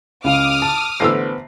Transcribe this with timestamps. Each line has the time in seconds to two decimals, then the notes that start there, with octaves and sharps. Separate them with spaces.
0.24 C#2 C#3 F5 D6 D#6 F6
0.62 A5
1.00 A1 D3 B3 C5 E6 C7